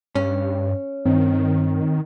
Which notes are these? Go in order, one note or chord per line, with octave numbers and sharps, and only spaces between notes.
G2 C#4
G2 D#3 C4